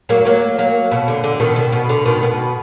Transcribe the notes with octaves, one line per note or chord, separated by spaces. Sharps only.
F#3 A#3
F#3 A#3
F#3 A#3
B2
D3
D3
B2 D#3
B2
B2
D3
B2 D#3
B2